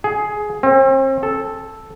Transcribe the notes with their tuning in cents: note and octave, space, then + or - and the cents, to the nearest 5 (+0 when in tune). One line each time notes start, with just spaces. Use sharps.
G#4 +15
C4 +40
A4 -5